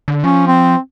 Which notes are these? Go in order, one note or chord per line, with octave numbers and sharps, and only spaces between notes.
D3
F3 C#4
C4